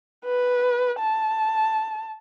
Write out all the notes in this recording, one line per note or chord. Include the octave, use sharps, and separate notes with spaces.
B4
A5